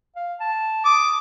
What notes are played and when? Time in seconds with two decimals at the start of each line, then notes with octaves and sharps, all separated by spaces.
0.16 F5
0.40 A5
0.85 D6 D#6